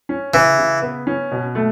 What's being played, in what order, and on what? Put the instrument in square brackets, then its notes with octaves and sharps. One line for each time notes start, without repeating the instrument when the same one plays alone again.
[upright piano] C#4
[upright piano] C#3 [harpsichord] E3
[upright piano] C#3
B3
C#4
B2
A3